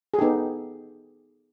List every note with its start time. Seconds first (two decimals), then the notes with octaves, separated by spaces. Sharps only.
0.14 G#4
0.19 B3 D#4 G4 A4